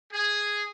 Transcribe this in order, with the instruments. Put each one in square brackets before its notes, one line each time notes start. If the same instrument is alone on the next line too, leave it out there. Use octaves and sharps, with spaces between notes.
[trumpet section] G#4